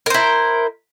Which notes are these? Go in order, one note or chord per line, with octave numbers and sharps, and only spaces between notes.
E4 A#4 C5